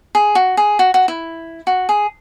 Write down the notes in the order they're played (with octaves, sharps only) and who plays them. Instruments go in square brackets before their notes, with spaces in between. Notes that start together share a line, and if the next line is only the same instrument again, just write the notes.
[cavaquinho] G#4
F#4
G#4
F#4
F#4
E4
F#4
G#4